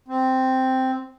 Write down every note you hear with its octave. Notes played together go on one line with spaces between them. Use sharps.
C4